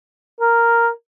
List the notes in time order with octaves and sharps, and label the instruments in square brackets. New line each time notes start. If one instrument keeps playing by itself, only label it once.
[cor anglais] A#4